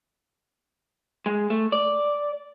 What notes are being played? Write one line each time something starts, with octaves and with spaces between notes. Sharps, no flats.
G#3
A3
D5